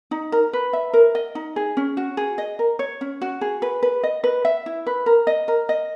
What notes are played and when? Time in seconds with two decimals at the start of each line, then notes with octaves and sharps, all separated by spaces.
0.11 D#4
0.32 A#4
0.53 B4
0.73 E5
0.93 A#4
1.15 D#5
1.35 D#4
1.56 G#4
1.77 C#4
1.97 F#4
2.17 G#4
2.38 D#5
2.59 A#4
2.79 C#5
3.01 C#4
3.21 F#4
3.41 G#4
3.62 B4
3.83 B4
4.03 D#5
4.24 B4
4.45 E5
4.66 E4
4.86 B4
5.06 A#4
5.27 D#5
5.48 A#4
5.69 D#5